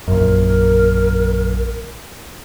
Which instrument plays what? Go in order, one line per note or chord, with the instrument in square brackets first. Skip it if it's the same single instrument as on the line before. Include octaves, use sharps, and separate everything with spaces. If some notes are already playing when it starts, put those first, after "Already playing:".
[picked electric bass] A#1 F#2 [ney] A#4